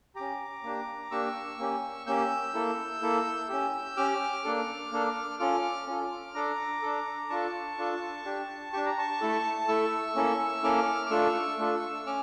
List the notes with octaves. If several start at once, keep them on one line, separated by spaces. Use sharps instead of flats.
C#4 G4 A#5 D6
A#3 D4 G4
A#3 D4 G4 C#6 E6
A#3 C#4 G4
A#3 C#4 G4 E6 G6
A#3 E4 A4
A#3 E4 A4
C#4 G4
C#4 G4 D6 F6
A#3 D4 A4
A#3 D4 A4
C#4 F4 A4 D6 F6
C#4 F4 A4
D4 A4 A#5 D6
D4 A4
D4 F4 A4 A5 C#6
D4 F4 A4
D4 G4
D4 G4 C#6
A#5
A5 C#6
A3 E4 A4
A3 E4 A4 C#6 E6
A#3 C#4 E4 A4
A#3 C#4 E4 A4 D6 F6
D6
A3 D4 F4 A4 C#6 E6
A3 D4 F4 A4
C#4 D6 F6